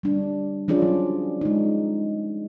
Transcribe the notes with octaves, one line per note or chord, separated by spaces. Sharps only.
G3 D4
F3 C#4 D4 F4 G#4 D5
F#3
G#3 D#4